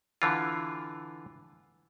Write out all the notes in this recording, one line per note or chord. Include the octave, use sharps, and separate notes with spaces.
D3 E3 F4